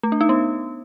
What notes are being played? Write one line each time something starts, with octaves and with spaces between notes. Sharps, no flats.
A3
D4
D#4
B3